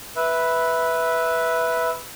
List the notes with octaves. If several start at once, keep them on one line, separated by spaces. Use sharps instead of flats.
B4 E5